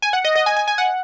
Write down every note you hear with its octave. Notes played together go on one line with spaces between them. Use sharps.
G#5
F#5
D#5
D#5
G#5
G#5
G#5
F#5